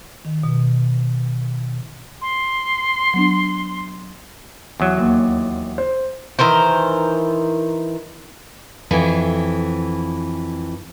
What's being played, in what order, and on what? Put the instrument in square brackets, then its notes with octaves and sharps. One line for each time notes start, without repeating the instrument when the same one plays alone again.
[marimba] D#3
B2
[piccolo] C6
[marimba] F#3 B3 D4
[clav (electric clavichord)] E2 F#3
[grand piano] D#2
C5
[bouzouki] D#3 E3 A#4 C5
[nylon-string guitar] F2 E3 G#5